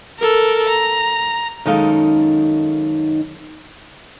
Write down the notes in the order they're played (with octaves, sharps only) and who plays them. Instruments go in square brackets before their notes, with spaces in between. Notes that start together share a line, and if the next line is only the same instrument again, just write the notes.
[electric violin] A4 A#4
A#5
[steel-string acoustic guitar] F#2 D#3 G#3 D#4 A4 F5